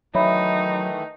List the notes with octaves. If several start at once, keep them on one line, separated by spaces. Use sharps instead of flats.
D#3 E3 F#3 A3 D#4 C#5 E5 B5